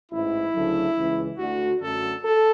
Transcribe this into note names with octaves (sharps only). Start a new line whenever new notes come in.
A1 G#2 E3 E4
D2 C#3 F#3 A3
C#2 C#3 E3
D2 D3 A3 F#4
F#2 D3 F#3 A3 A4
A4